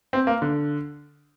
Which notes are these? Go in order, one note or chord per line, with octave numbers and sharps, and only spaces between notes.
C4
A#3
D3